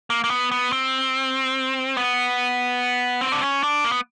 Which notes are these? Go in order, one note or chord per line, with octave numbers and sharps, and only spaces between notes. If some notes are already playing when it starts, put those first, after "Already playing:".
A#3
A#3
B3
B3
C4
B3
C4
D4
C#4
D4
A#3
B3